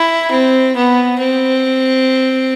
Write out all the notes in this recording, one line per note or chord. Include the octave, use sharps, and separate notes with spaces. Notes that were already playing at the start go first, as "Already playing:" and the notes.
Already playing: E4
C4
B3
C4